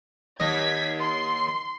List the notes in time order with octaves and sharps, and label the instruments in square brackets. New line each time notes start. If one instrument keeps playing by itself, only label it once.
[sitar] D#2 [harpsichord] D#5 [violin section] G#6 B6
[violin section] C6